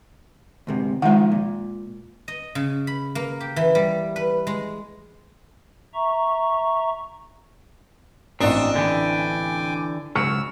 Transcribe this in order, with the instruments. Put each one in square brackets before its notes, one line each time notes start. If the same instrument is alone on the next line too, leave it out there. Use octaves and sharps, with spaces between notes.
[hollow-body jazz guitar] D2 G#2 C3
[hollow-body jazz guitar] D#3 F3 [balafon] G#3 F#5
[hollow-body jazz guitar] A#2
[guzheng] D#5
C#3
B5
A#3
G4
E3
G3
B4
G#3
[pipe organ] E5 A#5 C#6
[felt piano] A1 C4 D5 [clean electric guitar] A#2 [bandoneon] D#3 D#5 E6 [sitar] D4
[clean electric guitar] D3 E3 [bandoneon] G5 G#5 D6
[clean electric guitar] C#2 C#3 F#3 [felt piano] C#6 F6 C#7 [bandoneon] E6